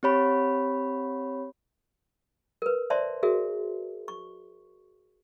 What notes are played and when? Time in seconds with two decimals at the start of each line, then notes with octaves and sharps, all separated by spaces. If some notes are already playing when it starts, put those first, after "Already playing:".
0.03 C4 G4 C#5 B5
2.62 A#4 B4
2.90 C5 D5 E5 A5 C6
3.23 F#4 G#4 A#4 E5
4.08 C#6